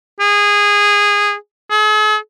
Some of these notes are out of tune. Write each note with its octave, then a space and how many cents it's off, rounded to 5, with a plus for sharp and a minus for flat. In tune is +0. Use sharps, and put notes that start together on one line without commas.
G#4 -20
G#4 +45